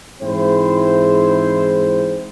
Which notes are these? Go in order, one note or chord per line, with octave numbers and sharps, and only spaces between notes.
G#2 E3 C4 E4 G#4 C5